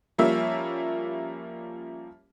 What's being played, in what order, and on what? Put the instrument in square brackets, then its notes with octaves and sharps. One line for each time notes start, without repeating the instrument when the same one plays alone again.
[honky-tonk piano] F3 G3 A#3 C#4 E5